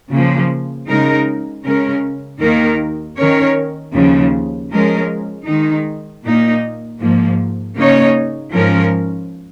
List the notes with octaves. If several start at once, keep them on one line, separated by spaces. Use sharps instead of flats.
C#3 F3 A#3
C#3 G#3 D#4 A#4
C#3 G#3 C#4 A#4
D#2 D#3 A#3 D#4 A#4
D#3 C#4 A#4 C#5
D#2 C#3 F3
F3 G#3 C#4 A#4
D#3 G#3 D#4
A#2 A#3 D#4
G#2 F3 A#3
C#3 A#3 D#4 C#5
G#2 F3 C#4 A#4